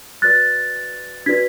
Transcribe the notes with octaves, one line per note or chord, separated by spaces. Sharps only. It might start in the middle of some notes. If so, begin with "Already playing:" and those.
F#4 B4 D5 F#6 A6
D4 F#4 B4 D5 G#6 B6